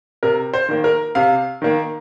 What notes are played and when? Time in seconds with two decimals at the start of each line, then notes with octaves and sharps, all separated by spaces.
0.23 C3 A#4
0.54 C5
0.69 D#3 A#3
0.84 A#4
1.15 C3 F5
1.62 D#3 A#3